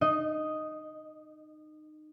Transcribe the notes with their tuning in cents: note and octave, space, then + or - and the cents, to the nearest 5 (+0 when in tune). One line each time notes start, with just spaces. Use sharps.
D#4 -25 D#5 +0